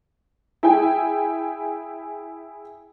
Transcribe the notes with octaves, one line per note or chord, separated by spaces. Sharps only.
E4 G#4 G5 G#5